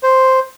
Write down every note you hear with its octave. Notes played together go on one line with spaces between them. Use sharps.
C5